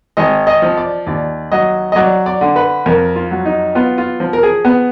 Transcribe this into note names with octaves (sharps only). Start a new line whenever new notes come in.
G#1 D#5
D#5
F3
D5
D#2 D5
F#3 D#5
D#5
F#3 D5
D5
D3
B4
F2 A#4
F4
F#3
D#4
B3 F4
F4
F3
A#4
G#4
B3